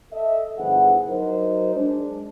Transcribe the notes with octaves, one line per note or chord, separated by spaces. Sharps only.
A4 D#5 E5
G1 E3 F3 E4 G#4 F#5
F#3 D#4 A#4 C5
G#3 D4